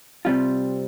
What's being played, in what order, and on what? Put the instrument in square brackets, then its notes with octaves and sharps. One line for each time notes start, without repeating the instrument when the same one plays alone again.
[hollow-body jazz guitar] C3 G3 F4 [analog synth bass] C4